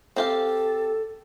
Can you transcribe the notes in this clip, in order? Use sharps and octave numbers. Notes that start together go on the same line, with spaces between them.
C4 G4 A4 F5